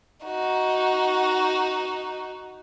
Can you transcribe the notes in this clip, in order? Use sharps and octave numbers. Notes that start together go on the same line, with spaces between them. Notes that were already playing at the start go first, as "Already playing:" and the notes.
D#4 F#4